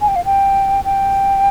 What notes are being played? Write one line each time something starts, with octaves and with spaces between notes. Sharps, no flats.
G#5
G5
F5
G5
G5